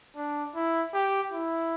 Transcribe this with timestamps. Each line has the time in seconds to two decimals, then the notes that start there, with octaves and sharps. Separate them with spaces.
0.16 D4
0.55 E4
0.94 G4
1.32 E4